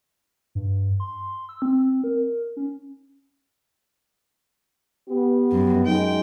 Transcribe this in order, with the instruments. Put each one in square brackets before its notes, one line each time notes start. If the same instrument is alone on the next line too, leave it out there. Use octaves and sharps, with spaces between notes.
[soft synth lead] G2
C6
E6
C4
A#4
C#4
[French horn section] B3 G4
[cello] F#2
[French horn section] F#2 G#3 D#4 [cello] G5